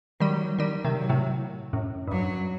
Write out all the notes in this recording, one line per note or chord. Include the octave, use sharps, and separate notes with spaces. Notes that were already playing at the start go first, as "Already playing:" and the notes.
D#3 F#3 G3
D#3 G3
C3 D#3
F#3
A2 C3
F#2 A2
G2
F#2 F#3